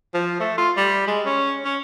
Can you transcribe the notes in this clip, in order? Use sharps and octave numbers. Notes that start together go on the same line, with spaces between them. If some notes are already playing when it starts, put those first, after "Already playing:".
F3
A3
F4
G3
G#3
C#4
C#4